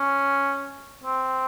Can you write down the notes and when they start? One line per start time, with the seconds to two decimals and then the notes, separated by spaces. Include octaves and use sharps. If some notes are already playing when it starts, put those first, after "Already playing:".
Already playing: C#4
1.04 C4